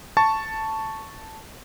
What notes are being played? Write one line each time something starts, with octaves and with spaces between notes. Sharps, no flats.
A5 C#6 A6